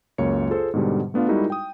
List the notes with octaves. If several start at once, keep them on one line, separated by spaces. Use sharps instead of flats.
C#2 F#2 A#3 C#5 C#7
F4 G#4 A4 C5
G#2 B2 D3 G3
A3 B3 D4 F4 F5
G3 G#3 D#4 E4 F#4 A#4
G5 D#6